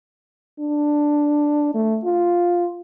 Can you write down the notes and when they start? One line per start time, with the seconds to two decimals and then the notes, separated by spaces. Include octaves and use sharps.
0.60 D4
1.74 A3
2.05 F4